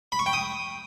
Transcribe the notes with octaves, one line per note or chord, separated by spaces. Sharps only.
B5
C#6
G5
D#6